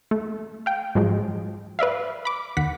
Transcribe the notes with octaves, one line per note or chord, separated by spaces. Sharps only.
A3
F5 G5
G#2 F3 F#3 G#3
B4 D5 E5 F5
B5 D6
D#2 F#5 B6